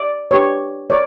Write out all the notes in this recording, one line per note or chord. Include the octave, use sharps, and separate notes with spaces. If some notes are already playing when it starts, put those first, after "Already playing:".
Already playing: D5
D4 G4 B4 C#5
A#4 C#5 D5